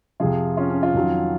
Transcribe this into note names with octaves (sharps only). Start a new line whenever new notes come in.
F2 C3 F3 F4 G#4
C#4 F4
C#4
C#4 F4
F2 D#3 F#3